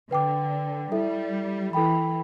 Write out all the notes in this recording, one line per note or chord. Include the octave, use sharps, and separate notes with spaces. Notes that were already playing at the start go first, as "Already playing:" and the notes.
D3 B4 G5 D6
G3 E4 A4 E5
E3 E4 A4 G5 B5